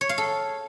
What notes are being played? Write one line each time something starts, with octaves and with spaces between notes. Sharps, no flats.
C#5
F5
A4